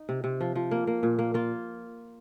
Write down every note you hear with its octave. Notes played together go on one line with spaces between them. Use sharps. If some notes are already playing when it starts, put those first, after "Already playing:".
Already playing: D#4
C3
C3
F3
F3
A#3
A#3
A#2
A#3
A#3 F4